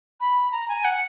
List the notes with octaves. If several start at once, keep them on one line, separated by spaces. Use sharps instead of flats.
B5
A#5
G#5
F#5